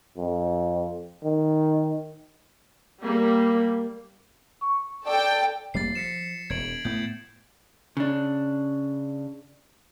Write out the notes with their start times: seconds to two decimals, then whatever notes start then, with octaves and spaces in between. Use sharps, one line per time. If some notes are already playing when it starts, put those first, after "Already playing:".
0.17 F2
1.24 D#3
3.03 G3 A#3
4.62 C#6
5.06 A4 D5 G5
5.74 F1 G3 A#3 A6 C7
5.95 F3 B6 C#7 E7
6.50 E1 G#6 D7 F#7
6.85 A2 B3 G6
7.97 C#3 D4